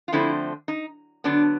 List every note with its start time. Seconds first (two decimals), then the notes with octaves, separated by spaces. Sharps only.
0.08 F4
0.12 D3 F3 A3 C4 E4
0.68 D#4
1.24 D3 F#3 B3 D4